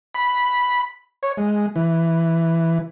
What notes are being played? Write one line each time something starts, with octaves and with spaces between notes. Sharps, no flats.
B5
C#5
G#3
E3